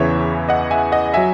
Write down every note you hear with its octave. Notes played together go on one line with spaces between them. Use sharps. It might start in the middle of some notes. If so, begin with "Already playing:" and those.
Already playing: E2 C#3 E3 C#5 E5
D#5 F#5
E5 G#5
D#5 F#5
F#3 E5 G#5